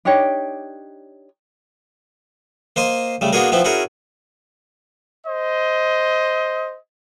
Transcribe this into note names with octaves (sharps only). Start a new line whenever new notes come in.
D4 D#4 G4 C#5
A#3 C5 D#5 C6
C#3 G3 A3
A#3 B3 D4 F#4 G#4 A#4
F3 B3 C4 E4
C#4 E4 F#4 G#4 A#4
C5 D#5